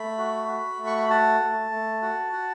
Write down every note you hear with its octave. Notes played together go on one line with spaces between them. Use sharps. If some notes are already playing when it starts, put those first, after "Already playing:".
Already playing: A3 B5
F#4
F#4
A3
C#6
B5
F#4 A5
A3
A3
F#4
F#4